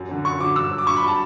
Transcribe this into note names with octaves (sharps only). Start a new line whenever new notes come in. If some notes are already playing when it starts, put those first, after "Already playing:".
Already playing: F#2
D3 F#3
F#2 C#6
D3 F#3 D6
G2 E6
F#3
D6
G2 C#6
B5
F#3
A5